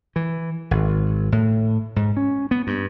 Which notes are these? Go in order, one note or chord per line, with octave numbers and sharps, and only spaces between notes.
E3
G#1
A2
G#2
C#4
B3
G2